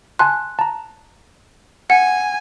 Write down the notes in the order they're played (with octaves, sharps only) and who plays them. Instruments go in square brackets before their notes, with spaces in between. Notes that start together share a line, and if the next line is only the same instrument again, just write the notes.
[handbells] G#5 A5 C6 [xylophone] F#6
[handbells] A5 A#5
[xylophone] F#5 [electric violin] G#5